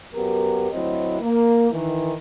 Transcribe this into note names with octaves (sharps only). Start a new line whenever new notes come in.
F#2 B3 G4 A#4
D2 F#3 C4 E4 D#5
A#3
D#3 E3